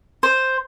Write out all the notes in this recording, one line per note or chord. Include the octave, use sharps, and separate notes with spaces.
C5